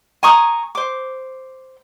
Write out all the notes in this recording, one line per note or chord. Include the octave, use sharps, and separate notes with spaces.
G#5 A#5 C#6 D#6
C5 D6